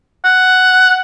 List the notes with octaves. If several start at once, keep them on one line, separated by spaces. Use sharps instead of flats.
F#5